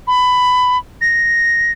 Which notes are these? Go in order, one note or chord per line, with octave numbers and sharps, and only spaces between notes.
B5
A#6